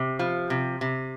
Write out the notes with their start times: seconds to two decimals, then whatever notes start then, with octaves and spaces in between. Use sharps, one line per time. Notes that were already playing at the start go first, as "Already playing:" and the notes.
Already playing: C3
0.19 F3
0.50 C3
0.81 C3